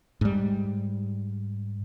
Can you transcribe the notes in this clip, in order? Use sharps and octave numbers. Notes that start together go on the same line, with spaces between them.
G#2 G3